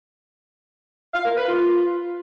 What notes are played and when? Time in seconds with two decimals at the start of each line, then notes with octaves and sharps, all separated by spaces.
1.14 F5
1.25 A#4
1.36 B4
1.47 F4